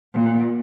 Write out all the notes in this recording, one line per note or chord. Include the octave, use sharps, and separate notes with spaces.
A#2